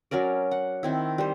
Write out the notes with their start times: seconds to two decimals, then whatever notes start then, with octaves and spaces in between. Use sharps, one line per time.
0.11 F#3 C#4 A#4 D5
0.51 F#5
0.83 D#3 C4 E4
1.18 G3 C5